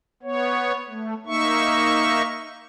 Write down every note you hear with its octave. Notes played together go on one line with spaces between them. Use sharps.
B3 C#5
A3
A#3 D#4 E5 C#6